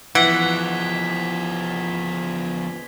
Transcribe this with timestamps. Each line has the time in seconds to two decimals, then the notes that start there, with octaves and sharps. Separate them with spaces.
0.15 E3 F3 B3 F#5 G#6 B6 G7